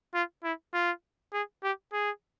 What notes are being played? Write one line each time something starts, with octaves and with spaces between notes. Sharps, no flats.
F4
E4
F4
G#4
G4
G#4